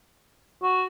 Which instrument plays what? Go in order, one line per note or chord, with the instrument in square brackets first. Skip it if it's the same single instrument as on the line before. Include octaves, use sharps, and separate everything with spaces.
[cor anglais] F#4